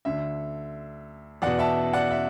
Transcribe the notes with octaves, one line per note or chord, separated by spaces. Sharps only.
D2 D3 E5
E2 B2 D5 F#5
E5 A5
D5 F#5
E5